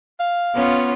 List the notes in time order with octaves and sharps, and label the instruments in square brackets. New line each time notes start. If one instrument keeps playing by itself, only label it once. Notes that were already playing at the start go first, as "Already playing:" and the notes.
[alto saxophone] F5
[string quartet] B3 C#4 F4